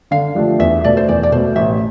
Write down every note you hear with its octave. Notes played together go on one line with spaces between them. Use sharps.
D3 F5
F3 A3 D4 G4
E2 E5
B2 A3 D5
C5
E2 D5
D5
B2 A3 C5
A1 E5